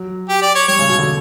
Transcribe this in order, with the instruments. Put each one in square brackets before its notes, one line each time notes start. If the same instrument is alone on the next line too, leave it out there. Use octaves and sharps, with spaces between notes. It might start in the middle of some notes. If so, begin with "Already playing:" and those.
Already playing: [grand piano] F#3
[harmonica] G4
D5
C#5
[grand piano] G3 [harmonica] C#5
[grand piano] C#3
B2
D3